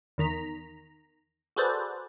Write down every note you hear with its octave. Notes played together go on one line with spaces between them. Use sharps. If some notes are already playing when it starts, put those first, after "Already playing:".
E2 D#3 A#5 B6
F#4 G#4 A4 B4 C5 D5